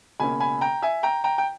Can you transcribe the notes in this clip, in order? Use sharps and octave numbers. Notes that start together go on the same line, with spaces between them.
C#2 B2 A#3 C#4 G#5 B5
G#5 B5
G5 A#5
E5 G#5
G5 A#5
G5 A#5
G5